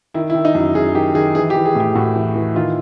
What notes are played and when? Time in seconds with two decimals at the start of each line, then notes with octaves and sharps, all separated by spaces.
0.14 D#3 E4
0.30 E4
0.34 D#3
0.45 D#4
0.55 F#2
0.60 E4
0.75 F#2 G#4
0.95 D#3 G4
1.15 D#3 G#4
1.35 E3 G#4
1.50 G4
1.55 E3
1.65 G#4
1.75 A2 G4
1.95 A2 F#4
2.16 E3
2.36 E3
2.55 D#3 F4